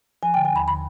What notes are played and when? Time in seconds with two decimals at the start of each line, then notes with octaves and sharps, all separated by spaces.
0.23 F3 G#5
0.34 G5
0.37 D3
0.45 G#5
0.53 D#2 B5
0.68 D3 B5